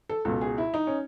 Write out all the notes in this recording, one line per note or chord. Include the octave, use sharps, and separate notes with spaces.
A4
C#2 B2 A4
G#4
E4
D#4
C#4